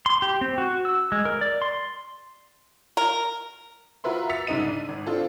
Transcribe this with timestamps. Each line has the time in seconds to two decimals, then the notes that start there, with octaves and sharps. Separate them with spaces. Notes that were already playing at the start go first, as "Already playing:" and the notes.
0.06 C6
0.22 G4
0.41 C4
0.58 F#4
0.85 E6
1.12 G#3
1.25 A#4
1.41 D5
1.62 C6
2.97 A#4
4.04 F4 F#4 A#4 B4 E5 C6
4.29 E6 A6 B6 C#7 F7
4.47 C2 G#2 C#3 D#5 D#7
4.63 D4
4.89 G#1
5.07 C4 D4 F4 A4